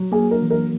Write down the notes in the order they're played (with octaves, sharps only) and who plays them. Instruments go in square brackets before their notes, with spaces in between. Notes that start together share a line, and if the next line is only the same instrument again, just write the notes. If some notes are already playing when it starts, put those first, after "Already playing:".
Already playing: [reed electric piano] F#3
[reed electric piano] A#3 [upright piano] G#4
[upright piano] A#4
[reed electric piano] E3
[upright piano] A#4